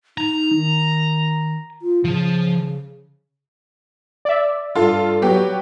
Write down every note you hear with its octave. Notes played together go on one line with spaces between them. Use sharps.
D#4 A#5
D#3
F4
C#3 F3
D5 E5
G2 F4 A4
F#3 B3 G4